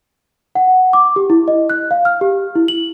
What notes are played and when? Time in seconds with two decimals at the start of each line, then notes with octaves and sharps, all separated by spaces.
0.55 F#5
0.93 D6
1.16 G4
1.30 E4
1.48 D#5
1.70 F#6
1.91 F5
2.05 F6
2.21 G4
2.55 E4
2.68 F#7